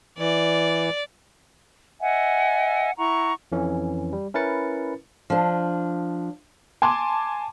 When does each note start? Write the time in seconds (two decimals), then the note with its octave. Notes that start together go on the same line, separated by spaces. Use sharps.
0.18 E3 D5
2.00 D#5 E5 F#5 G#5
2.98 E4 F#5 A#5 C#6
3.52 F2 E3 C#4
4.13 G3
4.34 C#4 E4 A#4 B4 A6 C#7
5.30 F3 D4
6.82 G#5 A5 C6 D6